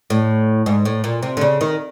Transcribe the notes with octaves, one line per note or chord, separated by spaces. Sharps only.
A2
G#2
A2
A#2
C3
D3
C#3
D#3